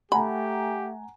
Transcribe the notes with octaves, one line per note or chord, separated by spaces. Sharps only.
A3 G4 F#5 G#5 A#5 B5